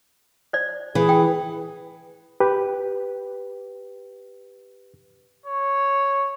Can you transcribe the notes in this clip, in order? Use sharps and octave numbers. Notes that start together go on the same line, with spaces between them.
C5 D5
E3 G#4
G5
G4 B4
C#5